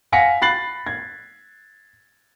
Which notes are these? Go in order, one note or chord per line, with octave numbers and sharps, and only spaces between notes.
F5 F#5 G#5 A#6 B6 C#7
B5 F#6 A6 C7 F#7
G#6